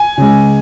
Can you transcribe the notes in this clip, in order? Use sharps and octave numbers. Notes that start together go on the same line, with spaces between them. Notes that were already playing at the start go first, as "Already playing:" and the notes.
Already playing: G#5
C#3 G#3